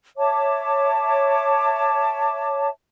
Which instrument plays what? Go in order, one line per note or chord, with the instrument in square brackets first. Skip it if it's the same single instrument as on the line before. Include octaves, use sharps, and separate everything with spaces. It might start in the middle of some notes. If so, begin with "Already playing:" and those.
[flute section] C#5 E5 A5 D6